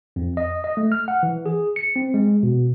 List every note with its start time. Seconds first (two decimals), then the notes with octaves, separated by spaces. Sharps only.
0.16 F2
0.37 D#5
0.64 D#5
0.77 A3
0.92 F6
1.08 F#5
1.23 E3
1.46 G#4
1.76 C#7
1.96 C4
2.14 G#3
2.43 B2